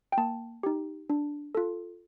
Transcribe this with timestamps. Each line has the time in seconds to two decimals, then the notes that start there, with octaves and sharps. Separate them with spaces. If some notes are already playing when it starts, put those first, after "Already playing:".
0.12 G5
0.18 A#3 A5
0.63 D#4 G4
1.10 D4
1.55 F4 A4